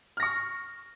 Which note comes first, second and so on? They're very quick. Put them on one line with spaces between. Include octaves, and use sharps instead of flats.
F6 A#6 C#6